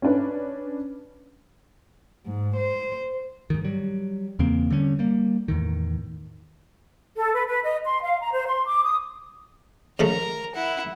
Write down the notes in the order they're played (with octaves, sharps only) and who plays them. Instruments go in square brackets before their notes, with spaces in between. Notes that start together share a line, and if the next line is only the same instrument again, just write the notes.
[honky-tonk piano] C#4 D4 B4
[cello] G#2
C5
[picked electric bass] G#2 D#3
F#3 G3
E2 C#3 A#3 C4
D3 G3 B3 C#4
G3 A#3
E2 A2 D#3
[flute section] A4
B4
B4
D#5
C6
F5
A#5
C5
C6
D6
D#6
[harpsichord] C#3 F3 A3 [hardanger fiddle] A#4 A#5
[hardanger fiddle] E4 F#5